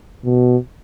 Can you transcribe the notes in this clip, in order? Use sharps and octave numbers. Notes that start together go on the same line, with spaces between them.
B2